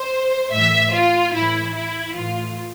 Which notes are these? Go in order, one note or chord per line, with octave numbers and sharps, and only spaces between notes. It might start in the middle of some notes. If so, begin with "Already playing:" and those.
Already playing: C5
A2 E3 E5
F4
A2 E3 E4
E4
A2 E3 F4